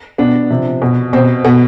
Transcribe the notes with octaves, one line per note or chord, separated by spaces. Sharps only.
B2 B3 D4
C3 F3
B2
B2 C4
B2 B3